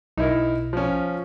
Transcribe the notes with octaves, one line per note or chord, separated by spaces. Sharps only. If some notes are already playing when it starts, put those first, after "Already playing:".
B1 D#4 E4 A#4
F3 C#4